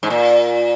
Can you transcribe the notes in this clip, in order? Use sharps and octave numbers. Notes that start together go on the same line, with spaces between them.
G#2
A#2